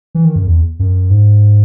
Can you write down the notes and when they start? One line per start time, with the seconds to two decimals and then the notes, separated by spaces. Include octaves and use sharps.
0.15 E3
0.25 D#3
0.36 F#2
0.47 E2
0.79 F#2
1.10 G#2